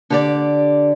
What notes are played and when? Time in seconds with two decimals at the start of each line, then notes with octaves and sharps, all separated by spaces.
0.10 D3 G4 D5